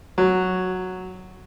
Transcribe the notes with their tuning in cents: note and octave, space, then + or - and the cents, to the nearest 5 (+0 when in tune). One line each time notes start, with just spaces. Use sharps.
F#3 -5